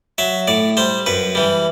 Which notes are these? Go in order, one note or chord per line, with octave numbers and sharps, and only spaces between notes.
F#3 E5
A2 D5
G3 C5
F#2 B4
E3 G3